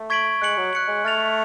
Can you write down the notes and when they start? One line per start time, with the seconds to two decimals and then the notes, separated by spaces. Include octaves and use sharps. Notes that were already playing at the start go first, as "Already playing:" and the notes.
Already playing: A3
0.10 C#6 G#6 B6 D7 F#7
0.42 G#3 F#6 C#7 F#7
0.57 F#3
0.73 F#6 C#7 F#7
0.88 G#3
1.05 A3 F6 A6 F7